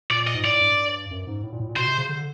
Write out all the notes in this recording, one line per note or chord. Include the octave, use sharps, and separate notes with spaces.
A#2 D5
D#5
G#2
A2 D5
G2
F#2
G#2
A2
A#2
A2
A#2
B2 C5
C3
C#3
D3